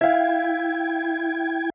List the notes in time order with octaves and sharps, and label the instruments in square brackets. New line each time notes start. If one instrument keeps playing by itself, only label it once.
[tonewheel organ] E4 G5 G#6 [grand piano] E5 F5